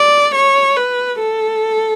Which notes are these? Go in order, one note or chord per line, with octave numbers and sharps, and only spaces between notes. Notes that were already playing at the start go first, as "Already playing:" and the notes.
Already playing: D5
C#5
B4
A4